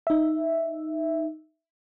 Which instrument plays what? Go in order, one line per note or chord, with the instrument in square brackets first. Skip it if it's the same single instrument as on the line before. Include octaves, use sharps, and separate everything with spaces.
[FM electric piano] D#4 E5